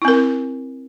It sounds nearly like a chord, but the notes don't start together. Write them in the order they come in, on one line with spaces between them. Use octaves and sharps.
E4 C4 A#4